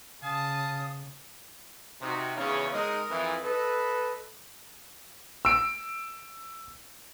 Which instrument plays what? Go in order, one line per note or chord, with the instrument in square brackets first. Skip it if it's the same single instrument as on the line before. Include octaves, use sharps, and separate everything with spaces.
[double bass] C#3 [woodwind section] F5 G#5 D#6 [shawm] A5
[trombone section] C3 [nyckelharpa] D#4 F#4
[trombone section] E2 C#3 [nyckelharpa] C#5
[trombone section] G#3 D#4 [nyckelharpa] A#4 D#6
[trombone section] F2 E3
[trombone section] A4 B4 [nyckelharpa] D#5
[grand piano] E6 D7